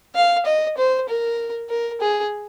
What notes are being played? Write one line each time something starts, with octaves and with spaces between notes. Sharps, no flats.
F5
D#5
C5
A#4
A#4
G#4